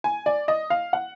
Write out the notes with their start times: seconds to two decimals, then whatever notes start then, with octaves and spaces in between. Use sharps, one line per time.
0.04 G#5
0.26 D5
0.48 D#5
0.70 F5
0.93 F#5